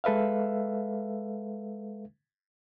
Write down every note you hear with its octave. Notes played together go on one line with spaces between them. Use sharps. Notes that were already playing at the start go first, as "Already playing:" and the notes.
G#3 A4 B4 E5 F5